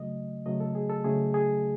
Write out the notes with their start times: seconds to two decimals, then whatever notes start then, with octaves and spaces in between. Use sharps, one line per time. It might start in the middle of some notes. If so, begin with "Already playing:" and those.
Already playing: C#3 F#3 A3 D#5
0.46 C#3 F#3 A3 D#5
0.60 A4
0.75 G#4
0.89 A4
1.04 C#3 F#3 A3 G#4
1.34 G#4